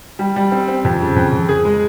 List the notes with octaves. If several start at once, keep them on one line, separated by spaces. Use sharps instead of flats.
G3
G3
C4
C4
F2
C#3
F2
F2
G#4
G#3